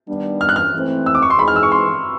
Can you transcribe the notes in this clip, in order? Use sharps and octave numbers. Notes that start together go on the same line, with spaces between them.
D#3 G3 B3 D4
F6
F#6
F6
G#2 E3 A3 C4
E6
D6
C#6
C6
E3 G#3 C4 D#4 G#4 B5
F6
E6
C#6
C6